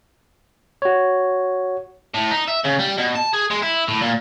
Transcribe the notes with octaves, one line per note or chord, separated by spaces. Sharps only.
F#4 C#5
A2
D#4
E5
C#3
G3
B2
A5
G#4
G#3
E4
A2
A#2